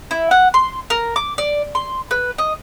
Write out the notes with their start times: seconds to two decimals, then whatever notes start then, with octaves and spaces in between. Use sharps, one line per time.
0.11 E4
0.31 F#5
0.54 C6
0.90 A#4
1.16 D6
1.38 D5
1.75 C6
2.11 B4
2.38 D#5